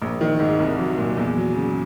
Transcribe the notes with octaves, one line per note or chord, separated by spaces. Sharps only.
A#1
D#3
G#2
C2
F#3
A#2
E2
F#3
C#3